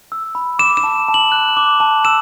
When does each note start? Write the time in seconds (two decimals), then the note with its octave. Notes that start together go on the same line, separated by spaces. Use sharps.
0.12 E6
0.35 B5
0.59 D6 E7
0.77 E7
0.84 A5
1.08 A5
1.14 F#7
1.32 F#6
1.57 D6
1.80 A5
2.05 E6 E7